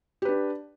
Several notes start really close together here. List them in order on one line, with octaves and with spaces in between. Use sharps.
G4 B4 D4